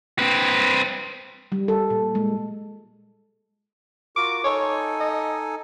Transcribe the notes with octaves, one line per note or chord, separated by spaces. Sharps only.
C4 B4
G3
A4
A#2
G#3
F4 F#4 A#4 D6
D#4 A4 C#5 G#5
D#5